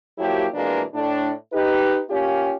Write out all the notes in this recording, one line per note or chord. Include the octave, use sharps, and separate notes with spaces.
F3 F#3 A#3 E4 G4
F2 B2 E3 G#3 A#3 D4
A2 D4
D#4 G4 B4
A#3 C#4 F4 G4